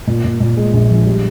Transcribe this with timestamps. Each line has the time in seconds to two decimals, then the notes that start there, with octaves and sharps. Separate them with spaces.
0.07 A#2
0.24 A#2
0.40 A#2
0.57 G#3
0.73 A#1
0.90 F3
1.07 G3